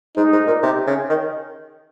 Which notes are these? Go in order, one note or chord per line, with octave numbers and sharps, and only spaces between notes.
G#2 D#4
G#2
A#2
C3
C#3
D#3